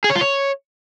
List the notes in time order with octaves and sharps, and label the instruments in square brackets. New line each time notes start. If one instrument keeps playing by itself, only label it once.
[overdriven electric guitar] G#4
C#5
F4
C#5